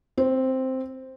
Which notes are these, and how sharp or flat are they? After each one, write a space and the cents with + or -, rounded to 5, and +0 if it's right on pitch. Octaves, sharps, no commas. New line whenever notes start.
C4 +0 C#5 -45